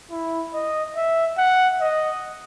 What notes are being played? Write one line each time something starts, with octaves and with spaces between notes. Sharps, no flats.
E4
D#5
E5
F#5
D#5